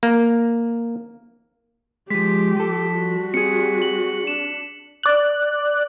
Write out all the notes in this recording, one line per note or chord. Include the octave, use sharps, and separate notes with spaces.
A#3
F3 G#3 G4 B6
F3 A4
G3 F#4
C4 G4 G#4 C#7
F#7
D4 E7
D5 F#6